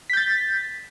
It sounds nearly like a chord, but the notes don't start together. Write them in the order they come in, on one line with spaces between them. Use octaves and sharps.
B6 G6 A6